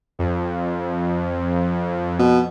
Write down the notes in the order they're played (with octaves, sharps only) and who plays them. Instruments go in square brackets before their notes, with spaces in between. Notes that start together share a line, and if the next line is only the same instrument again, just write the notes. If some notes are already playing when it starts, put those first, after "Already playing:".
[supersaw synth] F2
[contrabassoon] B2